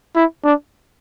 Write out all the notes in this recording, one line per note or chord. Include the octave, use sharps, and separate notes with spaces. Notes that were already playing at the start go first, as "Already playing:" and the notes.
E4
D4